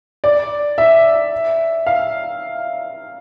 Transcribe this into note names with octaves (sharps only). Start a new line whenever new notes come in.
D5
E5
F5